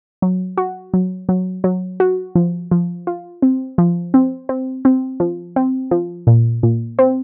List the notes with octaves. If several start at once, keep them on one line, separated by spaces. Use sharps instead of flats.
F#3
F#4
F#3
F#3
F#3
F#4
F3
F3
F4
C4
F3
C4
C4
C4
F3
C4
F3
A#2
A#2
C4